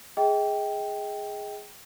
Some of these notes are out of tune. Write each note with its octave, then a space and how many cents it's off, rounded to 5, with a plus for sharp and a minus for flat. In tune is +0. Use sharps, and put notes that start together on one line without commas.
G#4 +0 D#5 +35 G5 +0